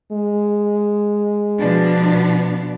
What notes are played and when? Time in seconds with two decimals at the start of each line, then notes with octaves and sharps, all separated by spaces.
0.12 G#3
1.59 B2 F3 D4